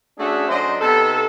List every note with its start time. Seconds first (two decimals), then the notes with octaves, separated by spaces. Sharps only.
0.18 A3 C#4 D4 F#4 G#4 E5
0.49 F#3 A3 C#4 D4 C5 D#5
0.81 C3 B3 D#4 A4